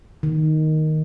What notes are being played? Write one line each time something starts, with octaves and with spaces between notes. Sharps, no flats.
D#3